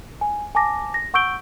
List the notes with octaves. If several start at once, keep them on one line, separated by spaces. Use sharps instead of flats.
G#5
G#5 A5 D6 A#6
A#6
F#5 C#6 E6 G6 D7 G7